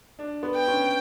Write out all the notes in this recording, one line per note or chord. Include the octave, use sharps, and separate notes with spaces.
D4
B3
G5
C#4